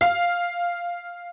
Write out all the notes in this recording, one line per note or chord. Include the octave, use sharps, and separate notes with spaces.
F5